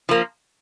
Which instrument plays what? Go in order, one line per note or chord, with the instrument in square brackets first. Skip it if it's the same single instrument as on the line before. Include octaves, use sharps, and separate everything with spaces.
[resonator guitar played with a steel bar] F3 A#3